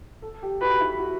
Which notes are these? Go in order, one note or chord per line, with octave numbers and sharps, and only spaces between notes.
A4
G4
F#4 B4
E4
F#4